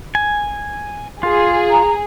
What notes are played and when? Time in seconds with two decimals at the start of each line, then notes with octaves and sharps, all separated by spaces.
0.15 G#5
1.23 F4 G#4
1.70 A#5